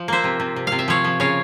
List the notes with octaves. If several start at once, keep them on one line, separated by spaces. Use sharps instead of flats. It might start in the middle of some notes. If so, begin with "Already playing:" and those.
Already playing: F3
A#3 C5 E5
C3
C3
C3
C3 F5
E5
F3 C#5 F5
F3
C#3 C#5 F5